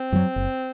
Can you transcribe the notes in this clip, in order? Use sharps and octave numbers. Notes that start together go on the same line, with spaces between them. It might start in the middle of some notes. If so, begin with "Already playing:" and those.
Already playing: C4
F#2 D#3 F#3
F#1